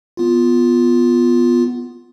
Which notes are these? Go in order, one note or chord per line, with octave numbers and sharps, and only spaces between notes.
B3 F4